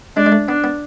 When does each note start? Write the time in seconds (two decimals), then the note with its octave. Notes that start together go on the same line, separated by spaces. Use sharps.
0.16 G#3 D4
0.26 G#3
0.32 A3
0.48 B3 D4
0.64 B3